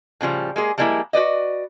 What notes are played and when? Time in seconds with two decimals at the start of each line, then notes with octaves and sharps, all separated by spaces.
0.21 A2 C#3 F3 G3
0.56 G#3 A#3 G#4
0.78 F3 G3 G#3 A#3 C#4 E4
1.13 F#4 B4 D5 D#5